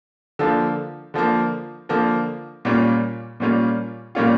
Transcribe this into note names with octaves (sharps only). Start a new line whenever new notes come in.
D3 F3 A#3
D3 F3 A#3
D3 F3 A#3
A#2 G3 A#3 C#4 F4
A#2 G3 A#3 C#4 F4
A#2 G3 A#3 C#4 F4